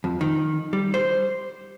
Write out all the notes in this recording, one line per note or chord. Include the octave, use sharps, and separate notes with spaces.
F2
D#3
G3
C5